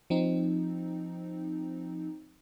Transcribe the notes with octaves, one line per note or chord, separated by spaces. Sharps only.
F3 C4 D#4